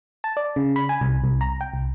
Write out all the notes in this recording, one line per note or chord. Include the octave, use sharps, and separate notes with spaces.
A5
D5
C#3
B5
G#5
C2
C2
A#5
G5
C2